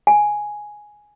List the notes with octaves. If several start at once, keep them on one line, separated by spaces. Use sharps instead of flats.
G#5